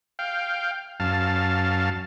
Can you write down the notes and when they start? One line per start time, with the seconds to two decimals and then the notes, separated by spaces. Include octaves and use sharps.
0.19 F5 G5
1.00 F#2 F5 A5